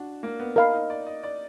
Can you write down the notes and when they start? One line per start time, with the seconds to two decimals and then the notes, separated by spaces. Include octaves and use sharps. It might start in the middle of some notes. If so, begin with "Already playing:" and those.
Already playing: D4 F#4
0.23 A#3
0.39 B3
0.56 D#4 A#4 F5 B5
0.73 D#4
0.90 D5
1.07 D#5
1.23 D5